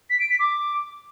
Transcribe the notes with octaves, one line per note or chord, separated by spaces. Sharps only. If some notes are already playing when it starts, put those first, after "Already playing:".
B6
D7
B6
D6